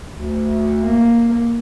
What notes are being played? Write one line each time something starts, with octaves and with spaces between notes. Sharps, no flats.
D2
A#3